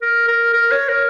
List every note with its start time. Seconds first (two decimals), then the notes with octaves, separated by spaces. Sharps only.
0.02 A#4
0.28 A#4
0.54 A#4
0.71 C#5
0.89 A#4